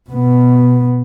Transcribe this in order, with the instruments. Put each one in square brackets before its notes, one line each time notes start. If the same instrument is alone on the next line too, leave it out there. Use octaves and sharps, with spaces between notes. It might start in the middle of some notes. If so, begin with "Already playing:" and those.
[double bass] B2 B3